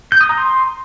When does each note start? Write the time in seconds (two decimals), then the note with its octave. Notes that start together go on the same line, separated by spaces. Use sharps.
0.12 G6
0.21 D#6
0.29 A#5
0.38 C6